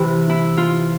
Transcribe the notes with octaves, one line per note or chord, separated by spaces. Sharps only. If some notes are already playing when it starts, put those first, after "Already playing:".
Already playing: C3 E3 E4
E4
F4